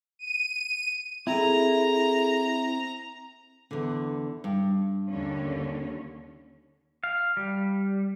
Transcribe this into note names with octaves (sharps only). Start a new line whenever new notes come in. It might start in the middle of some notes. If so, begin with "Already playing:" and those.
D#7
C4 E4 F#4 G#4 A4 A#5
E2 D3
G2
D#2 D3 C#4
F5
G3